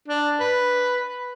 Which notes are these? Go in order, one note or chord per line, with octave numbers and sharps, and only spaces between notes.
D4
B4